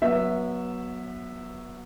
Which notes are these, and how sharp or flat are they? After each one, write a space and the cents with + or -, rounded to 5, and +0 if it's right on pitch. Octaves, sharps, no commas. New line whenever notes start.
F#3 +0 B3 -25 E5 +0